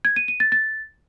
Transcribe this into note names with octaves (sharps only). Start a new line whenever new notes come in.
G#6
D#7
D#7
A6
A6